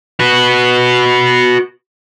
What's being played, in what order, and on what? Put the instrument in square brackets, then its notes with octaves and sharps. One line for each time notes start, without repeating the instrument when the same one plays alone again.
[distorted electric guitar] F#4 B4